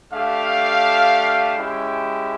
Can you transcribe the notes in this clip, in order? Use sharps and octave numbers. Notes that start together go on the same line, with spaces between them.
A3 D4 G4 F5
G#3 C#4 E4 G4 G5